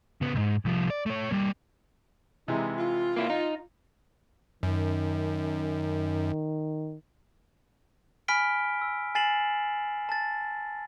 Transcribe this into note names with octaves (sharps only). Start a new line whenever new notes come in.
C#3 B3
C2 G#2
C2 F3
D5
A3 C#5
G3 A#3
C3 E3 G#3 D#4
F4
A#3 E4
D#4
F#2 D#3
G#5 B5 F6 B6 D7 G7
E6
G#5 A6 C7 E7 F#7
A5 A6